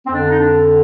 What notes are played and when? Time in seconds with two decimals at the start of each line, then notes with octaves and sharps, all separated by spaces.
0.06 C4
0.12 F2 D3 D4
0.29 D#4
0.39 D4